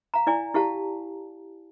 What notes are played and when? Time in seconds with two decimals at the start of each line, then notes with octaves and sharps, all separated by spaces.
0.14 F5 A#5
0.27 E4 D5 G#5
0.54 E4 G4 F5 A5